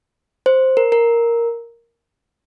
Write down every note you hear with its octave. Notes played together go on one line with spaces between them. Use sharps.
C5
A#4
A#4